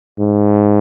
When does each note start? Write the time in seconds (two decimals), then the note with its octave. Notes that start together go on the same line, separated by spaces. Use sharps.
0.19 G#2